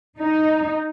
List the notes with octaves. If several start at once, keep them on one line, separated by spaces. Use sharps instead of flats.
D#4